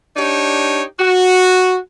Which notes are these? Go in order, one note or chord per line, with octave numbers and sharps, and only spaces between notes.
D4 D#4 G4 C#5
F#4